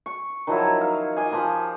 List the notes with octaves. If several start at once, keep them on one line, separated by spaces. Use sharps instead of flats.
C#6
D#3 F3 F#3 E4
C#5
F5
G4 D#5 F5 G#5
F3 G4 A#5 B5